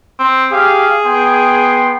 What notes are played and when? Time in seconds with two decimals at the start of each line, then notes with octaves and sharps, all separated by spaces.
0.19 C4
0.52 G4 G#4 F5
1.05 B3 G5 C6